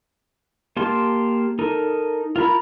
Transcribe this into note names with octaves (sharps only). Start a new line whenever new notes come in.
A#3 G4 F5 A5 C6
D#4 A4 A#4
F4 A#4 A#5 B5